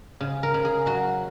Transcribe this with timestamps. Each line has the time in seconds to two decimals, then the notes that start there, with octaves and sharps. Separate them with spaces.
0.21 C#3
0.43 A#4
0.54 C#3
0.65 G#4
0.86 F#3 F#4